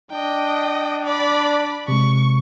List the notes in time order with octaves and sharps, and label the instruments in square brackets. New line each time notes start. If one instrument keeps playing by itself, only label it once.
[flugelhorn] D4 [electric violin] D#5 G5
[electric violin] D5 B5
[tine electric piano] C3 G#3 [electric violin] C#6